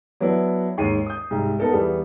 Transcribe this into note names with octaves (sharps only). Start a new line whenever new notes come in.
F#3 B3 D4 E4 B4
D#2 G#2 C7 D#7
D#6 G6
C2 G#2
B3 D#4 A4 A#4
E2 E3 G3 B3